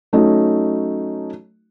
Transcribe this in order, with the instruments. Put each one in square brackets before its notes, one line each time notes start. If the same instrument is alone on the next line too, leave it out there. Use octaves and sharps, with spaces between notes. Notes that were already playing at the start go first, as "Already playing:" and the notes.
[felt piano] F#3 A3 C#4 D#4 F#4